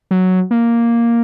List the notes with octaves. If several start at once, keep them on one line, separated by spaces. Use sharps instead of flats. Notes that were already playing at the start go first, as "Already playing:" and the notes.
F#3
A#3